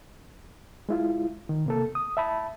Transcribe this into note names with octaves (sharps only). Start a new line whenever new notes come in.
G#3 E4 F4
D#3
C3 A#3 A4
D#6
E5 A5 B5